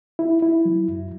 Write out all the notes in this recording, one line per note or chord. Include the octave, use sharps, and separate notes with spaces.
E4
E4
F#3
F#2